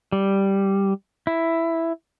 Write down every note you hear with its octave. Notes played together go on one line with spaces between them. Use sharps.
G3
E4